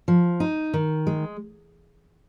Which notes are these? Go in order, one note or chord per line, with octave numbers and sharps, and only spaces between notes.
F3
D#4
D#3
G#3